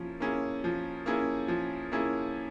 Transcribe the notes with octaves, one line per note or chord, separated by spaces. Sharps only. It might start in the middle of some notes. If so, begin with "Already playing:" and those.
Already playing: F3 A#3 C#4 E4
A#3 C#4 E4 G#4
F3
A#3 C#4 E4 G#4
F3
A#3 C#4 E4 G#4